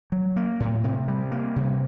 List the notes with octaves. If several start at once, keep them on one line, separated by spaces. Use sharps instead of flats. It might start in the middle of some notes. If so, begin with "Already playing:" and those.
F#3
A#3
A2
C3
G3
A#3
C3